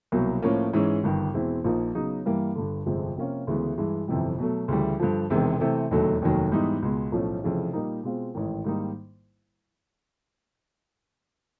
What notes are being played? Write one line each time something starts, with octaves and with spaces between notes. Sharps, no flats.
C2 B2 F#3 A#3
A2 F3 A#3 C#4
G#2 E3 G#3 C#4
G1 G2 D#3
E2 B2 G#3 C4 E4
A#1 A#2 F3 A#3 D#4
C#3 F#3 B3 D#4
G2 E3 G3 A#3
G1 G2 D3
G1 F2 C3 F3 G#3
C3 F3 A#3 C#4 F4
D2 C#3 E3 G#3 B3
G2 E3 G#3
G1 F2 C3 E3 G3
B2 F#3 A3
D2 C#3 E3 G3
G2 D3 F3
E1 E2 C3 D#3 G#3
C3 E3 A3 C4
E1 D#2 D3 F#3 A3
F1 D#2 D#3 F#3
G#2 E3 G3 B3 D#4
C#2 B2 G#3
B1 A2 F3 A3 C#4
F1 F2 C#3 E3
A#2 G3 A#3 D#4
B2 G#3 C4 F4
A1 G#2 D#3
G#2 D#3 G3 A#3 D#4